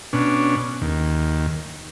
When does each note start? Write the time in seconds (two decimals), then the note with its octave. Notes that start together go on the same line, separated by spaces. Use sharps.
0.13 B2 C#4 D4
0.81 D#2